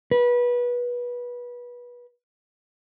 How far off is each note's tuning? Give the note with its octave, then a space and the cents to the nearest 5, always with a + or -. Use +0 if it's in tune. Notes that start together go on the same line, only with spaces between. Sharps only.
B4 -25